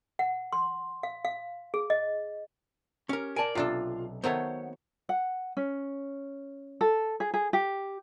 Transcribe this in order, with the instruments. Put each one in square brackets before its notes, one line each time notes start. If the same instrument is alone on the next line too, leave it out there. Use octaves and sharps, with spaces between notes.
[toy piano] F#5
C6
F5
F5
G#4
D#5
[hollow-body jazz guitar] C#4 A#4 [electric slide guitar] G4
[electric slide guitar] A#4 D5 [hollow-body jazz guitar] G#5 A5
[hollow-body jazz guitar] B1 [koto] C3 D4 A4 [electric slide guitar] F4
[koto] D#3 F#3 A3 [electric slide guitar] B3 [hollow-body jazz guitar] C5 C#5
[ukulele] F#5
C#4
A4
G#4
G#4
G4